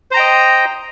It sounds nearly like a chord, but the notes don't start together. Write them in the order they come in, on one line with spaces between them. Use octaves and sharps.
C5 A#5 G5 D#5